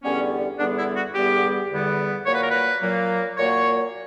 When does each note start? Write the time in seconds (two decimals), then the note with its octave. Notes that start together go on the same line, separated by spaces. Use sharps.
0.03 E2 D3 G3 B3 C#4
0.58 E2 D3 G3 B3 D4
0.77 E4
0.96 F#4
1.14 E2 D3 G3 B3 G4
1.70 E2 D3 G3 B3
2.26 A#2 F#3 A#3 C#5
2.34 B4
2.42 A#4
2.50 B4
2.82 A#2 F#3 A#3
3.38 A#2 F#3 A#3 C#5